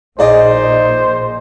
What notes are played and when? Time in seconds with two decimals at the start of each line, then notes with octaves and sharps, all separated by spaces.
0.19 A#1 A#2 D#4 G#4 C5 D5 D#5